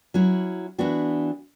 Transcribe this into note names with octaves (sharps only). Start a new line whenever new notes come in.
F#3 C#4 E4
E3 B3 D4 F#4